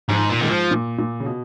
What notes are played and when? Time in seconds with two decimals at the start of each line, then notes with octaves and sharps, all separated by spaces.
0.09 G#2 F3
0.16 D#3
0.30 A#2
0.41 G#2 D#3
0.51 F3
0.71 A#2
0.98 A#2
1.20 C#3
1.26 B2